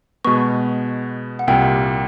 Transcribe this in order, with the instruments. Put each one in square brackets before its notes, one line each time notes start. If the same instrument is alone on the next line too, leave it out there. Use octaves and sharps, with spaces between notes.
[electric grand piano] B2 G#3 B3 [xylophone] C#6
[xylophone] F#5
[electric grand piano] C2 A#2 G3 [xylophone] G5